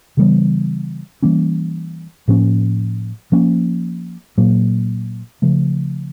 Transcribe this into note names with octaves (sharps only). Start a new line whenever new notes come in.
C#3 E3 G3 B3
E3 G3 A#3 C#4
A2 F3 A#3 C#4
F3 A#3 C#4
A#2 F#3 A#3
C#3 F3 A3